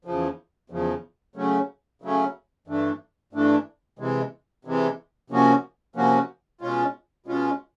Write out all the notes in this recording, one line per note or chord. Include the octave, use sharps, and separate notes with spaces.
E2 C#3 F3
E2 C#3 F3
C#3 F#3 A3 C#4
C#3 F#3 A3 C#4
G2 E3 A3 D4
G2 E3 A3 D4
C3 E3 G#3
C3 E3 G#3
C3 F3 A#3 C#4 F#4
C3 F3 A#3 C#4 F#4
B2 G#3 C#4 F4
B2 G#3 C#4 F4